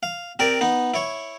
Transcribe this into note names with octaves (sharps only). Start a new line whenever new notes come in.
F5
C4 G4 A#4 D5
B3 D#4
E4 C#5